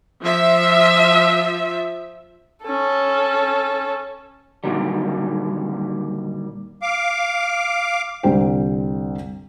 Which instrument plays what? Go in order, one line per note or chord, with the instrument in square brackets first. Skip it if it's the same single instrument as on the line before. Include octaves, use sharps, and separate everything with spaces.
[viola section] F3 E5
[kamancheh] C#4 A4
[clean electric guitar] A#2 D3 D#3 F#3 G3
[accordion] F5 D6
[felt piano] C2 D3 G4 C5 G5